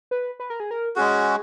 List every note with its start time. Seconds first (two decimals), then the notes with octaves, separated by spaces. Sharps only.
0.11 B4
0.40 B4
0.50 A#4
0.60 G#4
0.71 A#4
0.96 G#3 C#4 F#4 G#4